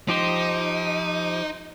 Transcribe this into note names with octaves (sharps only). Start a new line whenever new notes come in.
F3 D#4 G4 C5